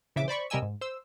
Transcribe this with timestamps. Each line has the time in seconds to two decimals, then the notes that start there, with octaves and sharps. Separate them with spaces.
0.16 A#1 C#3 E3 E5 D6
0.28 C5 D5 B5 C#6
0.50 C3 G3 A#4 D#5 G#5 E6
0.62 G#2
0.81 C5 E6